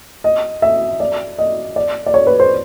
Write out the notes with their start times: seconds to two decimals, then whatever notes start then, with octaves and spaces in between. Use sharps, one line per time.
0.24 D#5
0.62 E5
1.00 D5
1.39 D#5
1.76 D5
2.06 D5
2.14 C#5
2.27 B4
2.40 C5